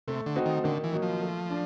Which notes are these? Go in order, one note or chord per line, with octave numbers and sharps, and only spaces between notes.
C3 A3
D3
C4 D#4 F#4
D#3
D3 D#3
E3
F#3 A#3 D#4
F3
A3
D4